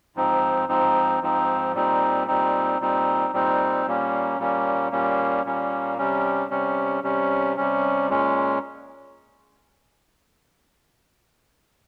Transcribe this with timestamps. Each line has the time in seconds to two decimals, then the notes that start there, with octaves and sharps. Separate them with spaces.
0.16 G#2 F3 C4 D#4
0.68 G#2 F3 C4 D#4
1.21 G#2 F3 C4 D#4
1.74 A#2 G3 C4 D#4
2.28 A#2 G3 C4 D#4
2.80 A#2 G3 C4 D#4
3.33 A#2 G3 C4 D#4
3.86 A#2 G3 A#3 C#4
4.39 A#2 G3 A#3 C#4
4.92 A#2 G3 A#3 C#4
5.45 A#2 G3 A#3 C#4
5.98 C3 G3 C#4
6.51 C3 G3 C#4
7.03 C3 G3 C#4
7.57 C3 G3 C#4
8.10 A#2 G#3 C#4